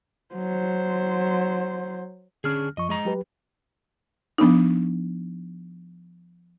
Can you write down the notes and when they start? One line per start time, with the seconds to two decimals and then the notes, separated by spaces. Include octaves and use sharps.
0.35 F#3 C5
2.44 D3 C#4 D4 G#4 F6
2.77 F#2 F3 D#5 C#6
2.89 G#3 D#5 A#5
3.05 F#3 G4 B4
4.38 F3 B3 D4 D#4